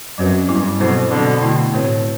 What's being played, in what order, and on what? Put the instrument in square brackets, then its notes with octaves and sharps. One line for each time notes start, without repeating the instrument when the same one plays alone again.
[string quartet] F#2 [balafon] F#3 C4 F#4 B4
[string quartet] G2 [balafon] F#3 B3 E4
[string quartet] B2 [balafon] F#3 C4 E4 A4 C5
[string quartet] B2 D3 [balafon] F#3 C4 F#4
[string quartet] B2 [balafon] D3 A3 E4
[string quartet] A2 [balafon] C4 F#4 B4